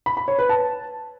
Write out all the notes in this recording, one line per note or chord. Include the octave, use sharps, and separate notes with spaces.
B5
B5
C#5
B4
A5